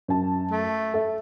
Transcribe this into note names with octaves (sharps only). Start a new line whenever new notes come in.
F#2 A5
A3
A4 E5